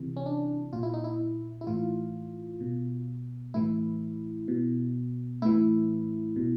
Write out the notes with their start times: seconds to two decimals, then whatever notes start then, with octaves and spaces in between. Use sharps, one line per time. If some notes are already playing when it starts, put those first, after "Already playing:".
Already playing: C3 E3
0.17 C#4
0.26 D4
0.73 A#2 F4
0.83 E4
0.94 D#4
1.04 E4
1.61 E4
1.67 A2 E3 F4
2.60 B2
3.54 A2 E3 E4
4.48 B2
5.42 A2 E3 E4
6.36 B2